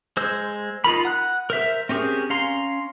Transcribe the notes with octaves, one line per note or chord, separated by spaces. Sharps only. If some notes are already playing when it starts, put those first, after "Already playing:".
G#3 C5 E6
D#4 F4 A#4 B5
F#5 F#6
A#4 C5 E5
C4 C#4 G4 G#4 A#4
C#4 F5 A#5 C6